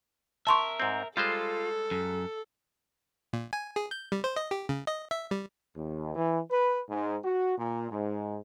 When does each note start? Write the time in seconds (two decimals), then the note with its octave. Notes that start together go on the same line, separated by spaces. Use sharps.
0.47 A#4 E5 A5 C6 C#6
0.80 G#2 C4
1.17 G3 G#3 F4 A4 C5
1.91 F#2
3.33 A#2
3.53 G#5
3.76 G#4
3.91 G6
4.12 G3
4.24 C5
4.36 D#5
4.51 G4
4.69 C#3
4.87 D#5
5.11 E5
5.31 G3
5.75 D#2
6.15 E3
6.50 B4
6.89 G#2
7.23 F#4
7.57 A#2
7.90 G#2